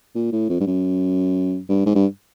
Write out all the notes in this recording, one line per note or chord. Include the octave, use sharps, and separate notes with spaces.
A#2
A2
F2
G2
F#2
G2
G#2
G2